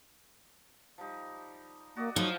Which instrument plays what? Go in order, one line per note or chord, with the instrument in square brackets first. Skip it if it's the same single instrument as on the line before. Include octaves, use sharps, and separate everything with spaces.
[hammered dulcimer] F3 G3 D#4
[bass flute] A#3 [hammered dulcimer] F#4 D5 D#5
[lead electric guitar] F3 [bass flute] F#3 [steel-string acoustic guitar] D#4 [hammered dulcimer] E4